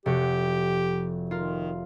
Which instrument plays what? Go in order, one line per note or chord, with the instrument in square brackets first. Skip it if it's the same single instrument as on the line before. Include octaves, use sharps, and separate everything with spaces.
[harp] F1 F#4 [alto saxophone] G4
[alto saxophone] D#3 [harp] F4 A#4